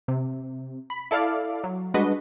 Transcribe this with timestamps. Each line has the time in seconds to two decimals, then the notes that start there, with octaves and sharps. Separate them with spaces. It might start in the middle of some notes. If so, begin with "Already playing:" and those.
0.08 C3
0.90 B5
1.11 E4 A4 D5 F5
1.64 F#3
1.94 G3 G#3 D4 F#4 B4 D#5